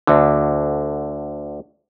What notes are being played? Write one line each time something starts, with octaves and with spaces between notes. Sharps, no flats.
D2 D3